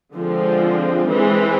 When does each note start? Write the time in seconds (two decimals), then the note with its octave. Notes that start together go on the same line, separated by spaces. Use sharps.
0.13 D3 F3 G#3 C4
1.08 E3 G#3 C4